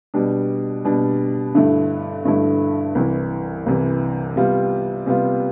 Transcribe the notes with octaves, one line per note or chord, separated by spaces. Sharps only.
B2 G3 D4
B2 G3 D4
G2 D3 A3 E4
G2 D3 A3 E4
C2 C3 E3
C2 C3 E3
C3 G3 B3 F4
C3 G3 B3 F4